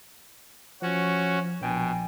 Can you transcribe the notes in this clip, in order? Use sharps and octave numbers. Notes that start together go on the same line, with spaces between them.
F3 C#4 F#4
A#1 B2 G5 G#5